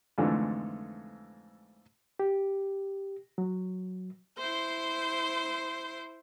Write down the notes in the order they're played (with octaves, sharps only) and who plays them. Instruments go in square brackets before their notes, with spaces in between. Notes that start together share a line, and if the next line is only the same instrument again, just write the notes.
[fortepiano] F2 G#2 D3 E3 A3
[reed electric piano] G4
F#3
[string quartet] E4 C5 C6 G6